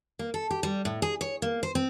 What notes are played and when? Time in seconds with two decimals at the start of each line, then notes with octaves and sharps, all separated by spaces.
0.19 A#3
0.34 A4
0.51 G4
0.63 G3
0.85 A2
1.02 G#4
1.21 C#5
1.42 A#3
1.63 C5
1.75 C4